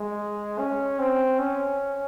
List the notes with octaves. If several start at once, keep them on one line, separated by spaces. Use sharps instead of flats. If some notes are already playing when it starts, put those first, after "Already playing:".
Already playing: G#3
C#4
C4
C#4